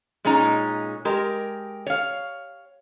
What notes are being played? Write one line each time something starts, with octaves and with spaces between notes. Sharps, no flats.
A#2 G#3 C#4 D#4 A#5
G#3 G4 A#4
C#5 F5